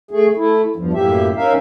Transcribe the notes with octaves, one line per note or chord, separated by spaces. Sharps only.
A3 G#4
A3 E4
E2 G2 F3
F#2 A2 A#3 G4 E5
C#4 D#4 A#4 E5 F5